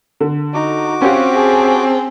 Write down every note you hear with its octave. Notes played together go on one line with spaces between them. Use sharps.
D3
D#4 F#4 D6
C4 C#4 F4 G4 F#5
G#4 A5